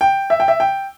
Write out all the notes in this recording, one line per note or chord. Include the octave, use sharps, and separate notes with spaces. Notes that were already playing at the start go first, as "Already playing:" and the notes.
G5
E5
G5
E5
G5